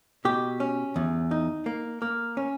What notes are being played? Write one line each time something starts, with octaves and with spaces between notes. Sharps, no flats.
B2 G4
C#4
E2
D#4
A#3
A#3
C#4